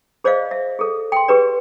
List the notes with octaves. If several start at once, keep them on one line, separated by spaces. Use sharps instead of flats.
G#4 C5 D5 D#5 F5
E5
G#4 A4
G5 C6
G4 G#4 B4 D5